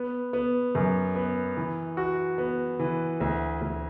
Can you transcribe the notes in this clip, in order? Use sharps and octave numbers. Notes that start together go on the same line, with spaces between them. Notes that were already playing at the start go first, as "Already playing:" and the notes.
Already playing: B3
B3
F#2
B3
E3
F#4
B3
E3
D2
D2